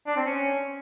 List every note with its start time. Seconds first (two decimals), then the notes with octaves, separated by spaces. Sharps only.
0.07 D4
0.16 C4
0.26 C#4